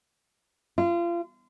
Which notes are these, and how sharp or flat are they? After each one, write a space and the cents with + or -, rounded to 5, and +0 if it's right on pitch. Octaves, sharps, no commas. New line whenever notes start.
F4 -30